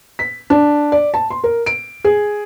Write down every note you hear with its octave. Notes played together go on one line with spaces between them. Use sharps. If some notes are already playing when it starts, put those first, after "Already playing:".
B6
D4
D5
A5
C6
A#4
D7
G#4